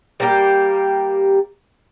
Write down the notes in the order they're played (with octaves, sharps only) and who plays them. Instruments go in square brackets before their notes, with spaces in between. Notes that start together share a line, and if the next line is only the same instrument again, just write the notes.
[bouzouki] G3 A#3 G4